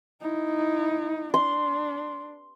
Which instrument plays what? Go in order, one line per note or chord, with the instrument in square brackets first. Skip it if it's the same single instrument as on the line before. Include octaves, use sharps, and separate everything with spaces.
[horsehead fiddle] D#4 E4
[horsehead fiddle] D4 [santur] C6